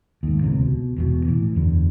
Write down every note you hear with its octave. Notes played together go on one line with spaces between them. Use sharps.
D#2 G#2
D#1 C#2 C3
B2
E1 E2 B2
A2 E3
F#1 E2 D3